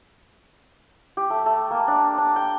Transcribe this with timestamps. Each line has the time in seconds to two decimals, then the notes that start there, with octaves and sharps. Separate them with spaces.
1.17 G4
1.30 A3
1.46 A3
1.71 A#3
1.88 D4
2.18 D4
2.36 G5